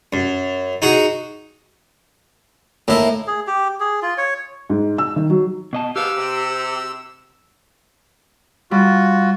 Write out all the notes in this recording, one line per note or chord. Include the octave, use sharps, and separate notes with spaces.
F#2
D#4 F#4 G#4
A2 A#3 D#4 E4
G#4
G4
G#4
F4
C#5
G#2
E6
D#3
F#3
B2 D#5 A5
G#2 B3 G4 F5 E6
C3
G3 F4 F#4